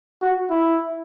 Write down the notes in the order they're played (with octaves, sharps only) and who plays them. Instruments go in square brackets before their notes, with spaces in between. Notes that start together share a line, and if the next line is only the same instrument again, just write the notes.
[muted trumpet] F#4
E4